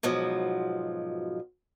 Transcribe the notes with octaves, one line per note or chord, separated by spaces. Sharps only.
G#2 B2 F3 F#3